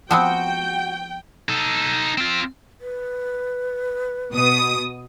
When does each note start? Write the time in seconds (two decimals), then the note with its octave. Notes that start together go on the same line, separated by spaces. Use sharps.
0.11 F3 B3 C4 F#4 G5
1.49 D#4 A4
2.18 C4 F4
2.81 B4
4.32 B2 D#6